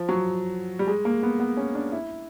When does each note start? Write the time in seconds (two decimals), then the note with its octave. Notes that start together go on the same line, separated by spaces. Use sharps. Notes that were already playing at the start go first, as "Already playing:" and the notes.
Already playing: F3
0.09 F#3
0.79 G3
0.87 G#3
1.05 A#3
1.23 B3
1.40 B3
1.57 C#4
1.75 D4
1.92 E4